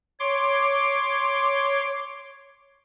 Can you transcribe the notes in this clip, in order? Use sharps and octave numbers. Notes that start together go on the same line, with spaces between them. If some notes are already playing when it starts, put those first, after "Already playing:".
C#5 C6 D6